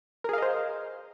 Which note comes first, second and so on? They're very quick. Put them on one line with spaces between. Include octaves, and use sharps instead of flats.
A#4 G#4 F5 D#5 C5